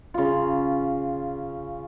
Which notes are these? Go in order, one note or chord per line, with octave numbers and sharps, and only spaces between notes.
C#3 F4